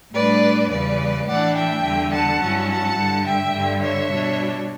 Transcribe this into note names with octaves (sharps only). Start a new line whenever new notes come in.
A2 G3 D4 B4 D5
E2 C#3 G3 B4 D5
A2 E3 A3 D4 D5 F#5
E5 G5
E2 D3 G3
F#5 A5
G2 F#3 C#4 E4
F#5 A5
G2 D3 G3
E5 G5
G2 D3 G3
C#5 E5
B2 G3 D4